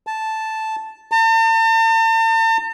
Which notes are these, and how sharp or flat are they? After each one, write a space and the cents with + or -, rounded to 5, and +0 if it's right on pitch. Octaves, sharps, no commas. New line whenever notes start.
A5 -5
A5 +45